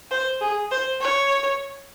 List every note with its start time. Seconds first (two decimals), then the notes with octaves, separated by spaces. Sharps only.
0.11 C5
0.41 G#4
0.71 C5
1.01 C#5